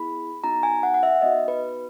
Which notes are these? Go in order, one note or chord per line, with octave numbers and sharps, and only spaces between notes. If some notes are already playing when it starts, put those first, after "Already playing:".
Already playing: B3 E4 G#4 B5
B3 D#4 F#4 A#5
G#5
F#5
F#5
E5
B3 D#4 F#4 D#5
B4